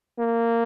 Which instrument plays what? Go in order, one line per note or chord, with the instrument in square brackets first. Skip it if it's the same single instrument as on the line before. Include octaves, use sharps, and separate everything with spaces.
[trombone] A#3